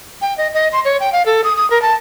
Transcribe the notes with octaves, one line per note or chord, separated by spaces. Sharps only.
G5
D#5
D#5
C6
C#5
G5
F5
A4
D#6
D#6
A#4
A5